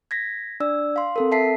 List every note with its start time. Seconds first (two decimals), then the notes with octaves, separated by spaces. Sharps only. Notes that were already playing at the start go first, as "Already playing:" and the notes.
0.11 G#6 A#6 B6
0.60 D4 D5 E6
0.96 F5 C6
1.16 C4 A4 A#4
1.32 E5 A5 B6 C7